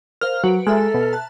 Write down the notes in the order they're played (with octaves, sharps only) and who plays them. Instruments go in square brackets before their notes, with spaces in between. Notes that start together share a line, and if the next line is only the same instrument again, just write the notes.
[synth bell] A#4 C5 F5 [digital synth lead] F6
[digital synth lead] F#3 [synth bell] F#4 B4 D7
[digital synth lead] G#3 [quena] A4 [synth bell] E5 A#5 F6
[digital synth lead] B2
[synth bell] A5 F#6